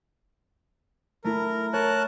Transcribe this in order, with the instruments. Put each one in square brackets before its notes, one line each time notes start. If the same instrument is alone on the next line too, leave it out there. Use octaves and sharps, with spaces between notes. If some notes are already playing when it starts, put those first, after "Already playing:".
[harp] A3 E4 [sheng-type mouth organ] A#4
[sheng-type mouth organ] A#4 A5 F#6 [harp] C#5